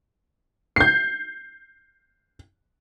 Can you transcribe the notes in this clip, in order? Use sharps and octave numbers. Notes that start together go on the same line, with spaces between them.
G6 C7